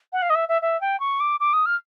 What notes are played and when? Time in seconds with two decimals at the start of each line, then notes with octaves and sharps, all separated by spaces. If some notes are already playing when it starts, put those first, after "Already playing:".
0.13 F#5
0.22 F5
0.30 D#5
0.35 E5
0.49 E5
0.62 E5
0.81 G5
1.00 C#6
1.20 D6
1.40 D6
1.53 D#6
1.66 F6